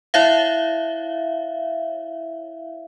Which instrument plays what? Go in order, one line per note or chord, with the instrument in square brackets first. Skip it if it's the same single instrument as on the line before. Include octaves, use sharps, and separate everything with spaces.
[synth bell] E4 C#5 E5 F5